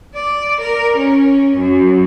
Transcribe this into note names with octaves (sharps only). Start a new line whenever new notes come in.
D5
A#4
C#4
F#2